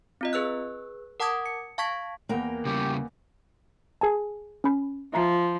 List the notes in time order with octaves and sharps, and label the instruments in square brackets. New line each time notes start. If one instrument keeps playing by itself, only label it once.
[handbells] C4 F4 D#5
G#4 B4 E6 F#6
A#4 F#5 A5 D6 D#6 G#6
C#7
F5 A5 C#6 G#6 B6
[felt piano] E2 F#5 B5 [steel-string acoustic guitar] A#3 A#4 G5
[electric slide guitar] C#3 G3 [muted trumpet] G4
[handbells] G#4 G#5 A5
C#4 B5
[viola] F3 [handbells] E5 A#5 C7